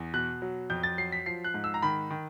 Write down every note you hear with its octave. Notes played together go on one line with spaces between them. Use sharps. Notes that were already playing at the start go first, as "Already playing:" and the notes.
Already playing: E2
B2 F#6
F#3
F2 G6
A6
F#3 C7
B6
F3 C7
F#6
G#2
E6
A#5
D#3 B5
D#3